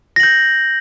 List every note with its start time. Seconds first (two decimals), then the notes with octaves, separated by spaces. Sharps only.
0.16 A#6
0.20 F#7
0.23 G6